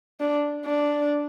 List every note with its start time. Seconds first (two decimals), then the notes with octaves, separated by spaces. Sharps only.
0.20 D4
0.65 D4